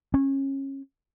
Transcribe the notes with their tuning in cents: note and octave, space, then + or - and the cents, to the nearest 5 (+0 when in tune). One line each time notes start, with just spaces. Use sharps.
C#4 -25